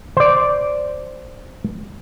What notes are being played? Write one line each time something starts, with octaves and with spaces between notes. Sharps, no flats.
C5 D5